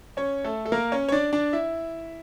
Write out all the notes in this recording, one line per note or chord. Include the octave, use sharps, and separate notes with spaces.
C#4 C#5
A3 A4
A4
A#3 A#4
C#4 C#5
C#5
D4 D5
D4 D5
E4 E5